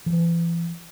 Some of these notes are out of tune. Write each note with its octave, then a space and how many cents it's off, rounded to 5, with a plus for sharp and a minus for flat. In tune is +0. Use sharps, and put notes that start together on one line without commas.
E3 +35